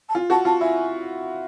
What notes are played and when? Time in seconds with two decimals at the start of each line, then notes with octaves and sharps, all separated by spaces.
0.09 A5
0.14 F4 G#5
0.30 F#4 A5
0.45 F4 A5
0.61 E4 G#5